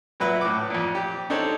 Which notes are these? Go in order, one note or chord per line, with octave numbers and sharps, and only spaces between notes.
A#2 F#3 B4 E5 F#6
A2 D6
F2 A#2
G4
D4 D#4 A4 C5 C#5